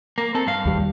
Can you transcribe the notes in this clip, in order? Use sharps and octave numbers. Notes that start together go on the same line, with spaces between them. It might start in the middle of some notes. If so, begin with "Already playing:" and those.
A#3
C4 A4
G2 F5
D#2 G3